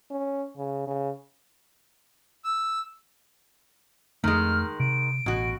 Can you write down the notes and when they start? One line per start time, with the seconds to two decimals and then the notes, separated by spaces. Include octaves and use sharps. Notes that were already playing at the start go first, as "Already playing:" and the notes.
0.10 C#4
0.57 C#3
0.87 C#3
2.44 E6
4.24 F2 D#3 G#3 A3 F6
4.80 C3 D7
5.26 A1 B2 F#4